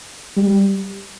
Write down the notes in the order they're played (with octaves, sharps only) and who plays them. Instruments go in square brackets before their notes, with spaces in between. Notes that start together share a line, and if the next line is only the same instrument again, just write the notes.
[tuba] G3